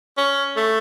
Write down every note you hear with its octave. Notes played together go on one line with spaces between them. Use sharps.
C#4
A3